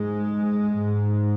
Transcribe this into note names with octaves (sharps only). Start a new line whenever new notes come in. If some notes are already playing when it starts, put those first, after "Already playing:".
Already playing: G#2 G#3
G#2